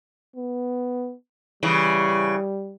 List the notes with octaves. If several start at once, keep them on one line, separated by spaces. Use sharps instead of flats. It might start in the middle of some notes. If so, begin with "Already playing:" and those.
B3
C#3 E3 G3